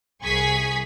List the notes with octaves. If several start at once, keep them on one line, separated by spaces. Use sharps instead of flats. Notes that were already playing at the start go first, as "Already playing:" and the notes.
C2 G#4 C#6 G#6 B6